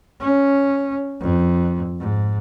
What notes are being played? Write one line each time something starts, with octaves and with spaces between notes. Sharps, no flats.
C#4
F2
G#2